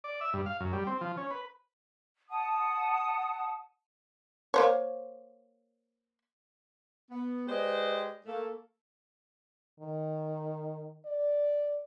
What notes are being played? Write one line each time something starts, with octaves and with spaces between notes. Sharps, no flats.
D5
E5
G2
F5
F#2
G3
C4
F3
C#4
B4
F#5 A5 D#6
A#3 C5 C#5
B3
G#3 G4 B4 C5 D5 D#5
A3 A#3 A4
D#3
D5